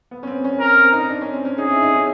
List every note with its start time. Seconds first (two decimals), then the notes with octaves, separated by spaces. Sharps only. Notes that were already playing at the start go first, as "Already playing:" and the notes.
0.11 B3
0.23 C#4
0.27 C4
0.44 C#4
0.60 C#4 A#4
0.76 C4
0.93 D#4
1.09 D4
1.21 C#4
1.33 C4
1.45 C#4
1.58 D#4 G#4
1.71 E4
1.83 D#4
1.95 C#4